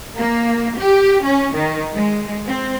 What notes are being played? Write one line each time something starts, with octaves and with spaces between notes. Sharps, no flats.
A#3
G4
C#4
D#3
G#3
C4